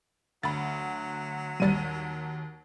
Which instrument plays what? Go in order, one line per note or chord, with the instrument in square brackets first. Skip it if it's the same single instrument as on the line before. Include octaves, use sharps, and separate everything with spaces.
[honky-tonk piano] D2 [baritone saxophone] F#3 [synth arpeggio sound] B5 A6
[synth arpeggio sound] A#1 G3 A6 [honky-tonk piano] D#2 D#7